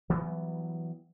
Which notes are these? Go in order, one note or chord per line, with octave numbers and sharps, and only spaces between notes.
E3 F#3 G3 B3